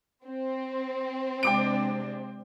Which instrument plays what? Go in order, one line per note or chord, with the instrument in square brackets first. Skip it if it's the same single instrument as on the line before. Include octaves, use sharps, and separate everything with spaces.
[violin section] C4
[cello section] C3 G#3 D4 [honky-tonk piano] G5 D6 D7